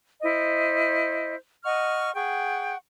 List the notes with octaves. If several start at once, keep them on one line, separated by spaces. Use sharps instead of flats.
E4 C5 D#5
D#5 F#5 C#6 F6
G#4 F#5 G5 C#6